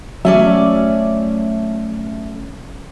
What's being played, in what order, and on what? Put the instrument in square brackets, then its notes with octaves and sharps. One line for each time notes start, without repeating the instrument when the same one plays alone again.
[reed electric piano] F#3 E5 [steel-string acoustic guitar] A3 C#4 D5